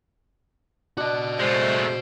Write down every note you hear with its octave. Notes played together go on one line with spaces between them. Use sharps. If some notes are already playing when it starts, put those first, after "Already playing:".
D4 F#4 D#5
G#3 A3 C5